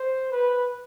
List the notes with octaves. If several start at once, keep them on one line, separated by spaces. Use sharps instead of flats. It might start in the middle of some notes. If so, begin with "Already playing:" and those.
Already playing: C5
B4